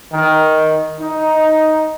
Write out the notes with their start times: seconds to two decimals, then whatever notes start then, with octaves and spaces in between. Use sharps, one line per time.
0.13 D#3
1.00 D#4